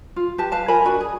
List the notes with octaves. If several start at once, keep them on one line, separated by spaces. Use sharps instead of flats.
F4
G4 B4 A5
B4 F5 A5
F4 A#4 G#5 B5
D4 F#4 G#5
G#4